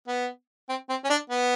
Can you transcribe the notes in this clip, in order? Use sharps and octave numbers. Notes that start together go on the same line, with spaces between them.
B3
C4
C4
C#4
D4
B3